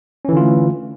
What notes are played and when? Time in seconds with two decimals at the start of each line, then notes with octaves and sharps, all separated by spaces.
0.25 C#4
0.29 E3
0.33 D3
0.37 F4
0.41 A3